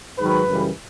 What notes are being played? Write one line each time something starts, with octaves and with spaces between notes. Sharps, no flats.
G#2 D#3 F#3 B4
F#2 C#3 E3 G3